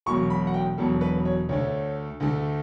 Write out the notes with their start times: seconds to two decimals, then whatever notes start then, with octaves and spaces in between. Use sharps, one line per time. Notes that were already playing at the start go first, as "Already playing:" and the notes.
0.06 E1 E2 B2 F#3 C#6
0.30 B5
0.47 F#5
0.54 G5
0.78 E1 E2 B2 F#3 A4
1.01 B4
1.25 C#5
1.49 D2 D3 A3 C#5
2.20 D2 D3 A3